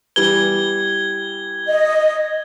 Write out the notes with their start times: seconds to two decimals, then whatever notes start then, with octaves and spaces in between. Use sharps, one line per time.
0.16 E3 G3 B3 G#6 G7
1.67 D#5